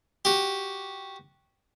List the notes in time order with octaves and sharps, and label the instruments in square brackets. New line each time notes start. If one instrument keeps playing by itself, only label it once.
[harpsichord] F#4 G4